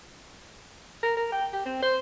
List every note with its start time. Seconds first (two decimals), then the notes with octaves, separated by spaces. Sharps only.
1.03 A#4
1.17 A#4
1.32 G5
1.53 G4
1.65 C4
1.82 C5